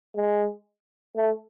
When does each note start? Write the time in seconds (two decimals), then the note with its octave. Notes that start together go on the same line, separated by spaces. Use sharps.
0.15 G#3
1.15 A3